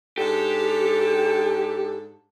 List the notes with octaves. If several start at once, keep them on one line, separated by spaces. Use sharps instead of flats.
G#2 D4 G4 A4